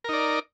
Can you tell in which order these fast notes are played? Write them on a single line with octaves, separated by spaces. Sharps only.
A#4 D#4 D5